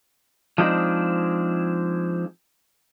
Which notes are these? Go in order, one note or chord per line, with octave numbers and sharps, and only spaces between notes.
F3 G#3 C4 D4 D#4